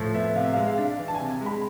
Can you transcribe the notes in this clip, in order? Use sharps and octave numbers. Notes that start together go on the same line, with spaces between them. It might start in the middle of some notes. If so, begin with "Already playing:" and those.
Already playing: A2 F3
B3 E5
C3 F5
E5
G#3 F5
F5
D4
E3
A5
G#5
C3
G#5
G#3
B5